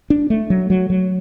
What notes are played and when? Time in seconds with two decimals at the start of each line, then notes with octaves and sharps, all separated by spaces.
0.10 D4
0.30 A3
0.50 F#3
0.70 F#3
0.90 F#3